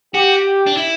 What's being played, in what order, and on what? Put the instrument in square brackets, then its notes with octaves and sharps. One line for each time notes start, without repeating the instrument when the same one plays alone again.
[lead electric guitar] F#4 [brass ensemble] G4
[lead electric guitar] D4
E4